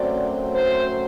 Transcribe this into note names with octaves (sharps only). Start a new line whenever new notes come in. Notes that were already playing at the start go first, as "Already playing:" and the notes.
Already playing: F#2 F#3 A3 C4 D5
C5